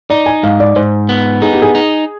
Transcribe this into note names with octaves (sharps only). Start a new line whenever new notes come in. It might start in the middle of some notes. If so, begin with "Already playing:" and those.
D#4 D5
G#5
G#2 F5
D5
G#2 C5
B3
D#4 G#4
G4
G#4
D#4